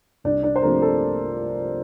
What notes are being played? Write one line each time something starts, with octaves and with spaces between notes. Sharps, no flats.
C2 D4 D5
D4 D5
C5
C3 F3 A3 A#3 D4 A#4
A4